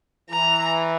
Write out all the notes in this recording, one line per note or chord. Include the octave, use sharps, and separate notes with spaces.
E3 A#5